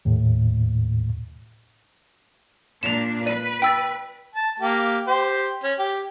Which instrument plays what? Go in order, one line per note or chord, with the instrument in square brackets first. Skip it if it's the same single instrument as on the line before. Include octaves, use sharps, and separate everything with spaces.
[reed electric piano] D#2 A2
[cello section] A#2 D4 [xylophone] E7 F7
[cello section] B4 [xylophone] D5 D#7
[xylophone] G5 E6 A6
[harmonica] A5
A#3 G4
G4 C5
C#4
G4